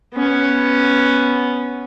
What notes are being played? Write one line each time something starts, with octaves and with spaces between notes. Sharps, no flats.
B3 C#4